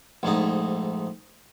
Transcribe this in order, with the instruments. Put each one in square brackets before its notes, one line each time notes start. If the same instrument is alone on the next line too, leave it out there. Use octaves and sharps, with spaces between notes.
[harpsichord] A#1 G#2 A3 D#4